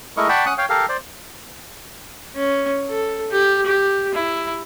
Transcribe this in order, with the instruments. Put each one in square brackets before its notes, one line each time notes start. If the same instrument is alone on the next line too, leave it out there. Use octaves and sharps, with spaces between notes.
[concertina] G#3 A3 E4 A#4 D#5 C#6
D5 F#5 G5 A5 B5 C#6
C#4 F#5 D#6 F#6
C#5 F5 G5
G4 A4 A#4 F5
C5 D5
[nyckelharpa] C#4
A4
G4
G4
E4